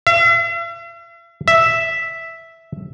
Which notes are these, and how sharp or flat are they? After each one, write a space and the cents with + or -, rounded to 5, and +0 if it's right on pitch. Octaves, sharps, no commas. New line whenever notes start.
E5 +45
E5 +0